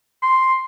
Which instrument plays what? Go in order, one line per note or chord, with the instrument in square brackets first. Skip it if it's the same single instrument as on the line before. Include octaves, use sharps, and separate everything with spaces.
[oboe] C6